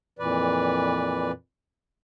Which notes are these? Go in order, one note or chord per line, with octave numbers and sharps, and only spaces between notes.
F2 A#2 E3 B4 D5